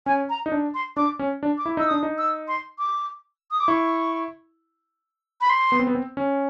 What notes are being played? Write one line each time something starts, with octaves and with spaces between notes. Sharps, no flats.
C#4 G#5
A#5
D#4
D4
C6
D4 D6
C#4
D4
D6
E4
D#4 E6
D4 D#6
D#4
E6
C6
D6
D#6
D6
E4 C#6
B5
C6
B3
C4
B3
C4
C#4